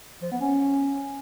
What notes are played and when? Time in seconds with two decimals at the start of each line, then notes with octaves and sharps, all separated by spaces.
0.22 F3
0.32 B3
0.41 C#4